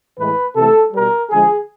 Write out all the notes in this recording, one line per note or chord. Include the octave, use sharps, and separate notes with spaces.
A2 E3 G#3 B4
C3 E3 A3 A4
B2 G3 A#4
D3 F3 G#3 G#4